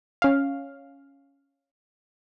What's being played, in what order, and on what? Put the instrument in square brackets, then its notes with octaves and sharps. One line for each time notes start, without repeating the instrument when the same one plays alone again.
[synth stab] C#4 F5